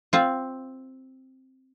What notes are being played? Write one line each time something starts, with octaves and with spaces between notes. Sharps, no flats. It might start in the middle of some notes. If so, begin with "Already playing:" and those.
C4 F4